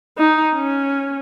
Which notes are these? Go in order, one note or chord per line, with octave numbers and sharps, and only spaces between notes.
D#4
C#4